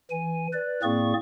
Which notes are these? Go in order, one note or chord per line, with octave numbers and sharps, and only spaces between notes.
E3 G#5
B4 D5
A2 A#3 C4 G#4 D5 C#6